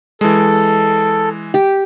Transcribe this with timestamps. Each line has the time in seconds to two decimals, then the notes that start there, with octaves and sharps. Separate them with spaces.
0.21 E3 G#3 A4
1.54 G4